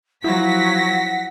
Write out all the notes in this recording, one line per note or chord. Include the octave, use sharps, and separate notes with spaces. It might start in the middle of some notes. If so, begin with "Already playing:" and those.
F3 F#3 E4 F#5 A#6 B6